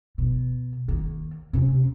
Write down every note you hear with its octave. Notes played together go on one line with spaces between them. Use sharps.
B2
D#3 A#3
C3 C#4